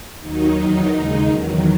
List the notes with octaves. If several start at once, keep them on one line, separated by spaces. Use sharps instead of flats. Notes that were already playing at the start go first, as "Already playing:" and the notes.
D#2 D#3 F#3 D#4
E2 D#3 F#3
D#2 C#3 G#3
E2 D#3 F#3